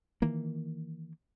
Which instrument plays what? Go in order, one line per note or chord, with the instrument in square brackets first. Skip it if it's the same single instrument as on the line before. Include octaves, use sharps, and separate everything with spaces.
[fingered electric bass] D#3 E3 A#3